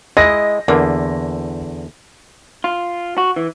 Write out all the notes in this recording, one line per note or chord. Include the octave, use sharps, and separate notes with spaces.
G#3 E4 D#5 A#6
E2 D3 A#3
F4
F#4
E3